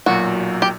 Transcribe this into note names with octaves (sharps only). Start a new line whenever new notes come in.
B1 A#2 F#3 F#4
G4